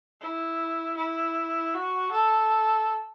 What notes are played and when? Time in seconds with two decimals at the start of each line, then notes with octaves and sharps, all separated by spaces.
0.21 E4
0.97 E4
1.73 F#4
2.11 A4